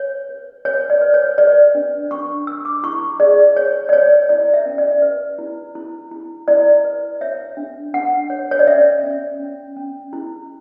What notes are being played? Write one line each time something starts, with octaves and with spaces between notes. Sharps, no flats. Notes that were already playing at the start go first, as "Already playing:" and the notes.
Already playing: B4 C#5
B4
B4 C#5
D5
B4
C#5
B4 D5
D4
D4 C#6
D4 E6
D6
E4 C#6
G#4 D5
C#5
D5
C#5
E4 D5
E5
C#4
D5
B4
E4
E4
E4
E4 D5
B4
C#5 E5
D4
D4 F#5
C#5
C#5
D5
C#4 E5
C#4
C#4
C#4
E4